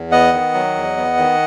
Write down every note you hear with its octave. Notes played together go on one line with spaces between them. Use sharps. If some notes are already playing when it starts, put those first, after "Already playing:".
Already playing: E2
B3 D#5 F#5
D#3
F#3
E2
B3
D#3